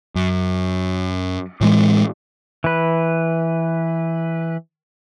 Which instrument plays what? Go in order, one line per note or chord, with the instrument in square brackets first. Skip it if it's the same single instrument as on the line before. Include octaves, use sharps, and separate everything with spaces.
[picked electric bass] F#2
A2 E3 G#3
[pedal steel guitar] E3 B4